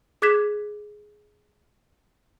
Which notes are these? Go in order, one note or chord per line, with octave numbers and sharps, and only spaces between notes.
G#4 D6 F#6 G#6 B6 E7